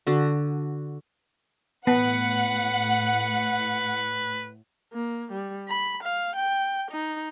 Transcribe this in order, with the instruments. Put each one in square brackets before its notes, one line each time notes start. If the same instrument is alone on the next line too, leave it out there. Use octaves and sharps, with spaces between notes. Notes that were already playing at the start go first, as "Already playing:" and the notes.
[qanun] D3 F#4
[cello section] A2 [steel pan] B3 [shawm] B4 [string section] F#5
[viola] A#3
G3
B5
F5
G5
D#4